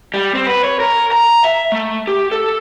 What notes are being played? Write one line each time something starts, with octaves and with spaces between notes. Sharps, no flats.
G3
C4
B4
C#5
A#4
A#5
E5
A3
G4
A4